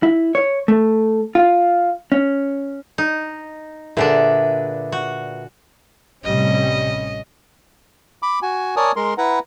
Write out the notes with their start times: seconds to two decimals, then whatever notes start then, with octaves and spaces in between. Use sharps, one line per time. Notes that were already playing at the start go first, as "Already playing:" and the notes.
0.03 E4
0.35 C#5
0.68 A3
1.35 F4
2.12 C#4
2.98 D#4
3.97 A#2 D3 D4 G#4 B4 E5
4.92 F#4
6.24 A1 C3 G3 C#4 D#5
8.22 B5 D6
8.42 F#4 G#5
8.76 A#4 C#5 D5 G#5 A5 D#6
8.96 G#3 A#4 C6
9.18 E4 B4 F#5 A#5